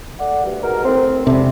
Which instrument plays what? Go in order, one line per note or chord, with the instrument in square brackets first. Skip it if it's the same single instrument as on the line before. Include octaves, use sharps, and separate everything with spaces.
[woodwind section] A3 D5 F#5
D2 G2
G#2 B2 A#4
D#2 A2 C4
[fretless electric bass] E1 C3 [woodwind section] A3 D4 E4